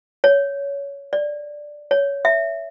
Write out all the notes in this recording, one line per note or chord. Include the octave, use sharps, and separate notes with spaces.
C#5
D5
C#5
E5